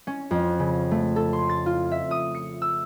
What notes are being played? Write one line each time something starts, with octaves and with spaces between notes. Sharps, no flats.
C#4
F2
C#3
A3
A4
C6
A6
F4
E5
D#6
C#7
E6